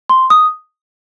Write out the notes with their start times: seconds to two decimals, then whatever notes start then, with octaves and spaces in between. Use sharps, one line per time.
0.10 C6
0.30 D#6